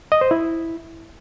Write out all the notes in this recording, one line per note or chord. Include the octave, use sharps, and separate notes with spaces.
D#5
C5
E4